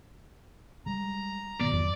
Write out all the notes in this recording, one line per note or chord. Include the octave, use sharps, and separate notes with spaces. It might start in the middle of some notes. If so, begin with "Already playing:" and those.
G3 G#3 A#5
G#2 B2 D#3 F#3 D5
F2